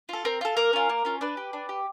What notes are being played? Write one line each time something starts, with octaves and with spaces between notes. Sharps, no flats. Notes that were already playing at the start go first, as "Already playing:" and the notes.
F4 A4
C4 A#4
F4 A4
A#3 A#4
C#4 F4
A#3
C#4 F4
D4 B4
G4
D4
G4